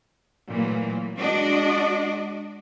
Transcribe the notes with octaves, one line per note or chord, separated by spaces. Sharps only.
A#2 E3 F#3 A3
G#3 D4 F#4 D5 D#5